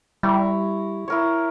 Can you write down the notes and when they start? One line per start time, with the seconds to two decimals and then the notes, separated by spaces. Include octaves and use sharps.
0.23 G3 E4 A#5 C#6
1.08 E4 A#4 C#5